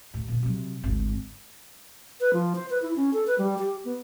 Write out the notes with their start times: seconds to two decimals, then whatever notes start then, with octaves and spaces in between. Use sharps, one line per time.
0.14 D#2 A2
0.28 A#2 D3
0.43 C3 F#3
0.84 G#1 D2
2.20 B4
2.33 F3
2.55 C5
2.70 B4
2.82 E4
2.96 C#4
3.13 A4
3.27 B4
3.38 G3
3.58 G4
3.85 B3